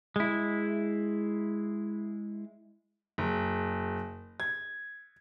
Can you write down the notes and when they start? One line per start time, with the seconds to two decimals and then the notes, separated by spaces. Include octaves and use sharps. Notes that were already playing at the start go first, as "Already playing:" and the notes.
0.16 G#3 E4
3.18 F#1
4.40 G#6